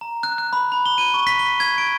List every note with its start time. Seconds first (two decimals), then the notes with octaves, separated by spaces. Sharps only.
0.01 A#5
0.23 F#6
0.38 F#6
0.53 B5
0.72 B5
0.86 G7
0.98 D#7
1.14 C#6
1.27 B6
1.39 G7
1.60 G#6
1.78 D7